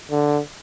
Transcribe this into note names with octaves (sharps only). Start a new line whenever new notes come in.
D3